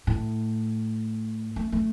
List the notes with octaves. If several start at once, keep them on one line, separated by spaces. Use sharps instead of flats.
A2
A3
A3